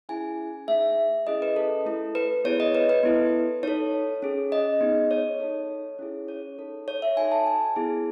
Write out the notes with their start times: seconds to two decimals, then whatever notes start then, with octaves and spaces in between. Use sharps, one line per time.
0.09 C#4 E4 G#4 G#5
0.67 A3 D#4 G#4 E5
1.27 C#4 E4 G#4 D#5
1.42 B4
1.56 A4
1.86 A3 E4 A4
2.15 B4
2.44 B3 E4 G#4 C#5
2.60 D#5
2.75 B4
2.89 B4
3.03 B3 E4 A4
3.63 D#4 A4 C#5
4.22 C#4 G#4
4.52 D#5
4.81 B3 D#4 G#4
5.11 C#5
5.40 D#4 A4
5.99 C#4 E4 G#4
6.28 C#5
6.58 D#4 A4
6.88 C#5
7.02 E5
7.17 D#4 F#4 A4 G#5
7.32 A5
7.47 G#5
7.76 B3 E4 G#4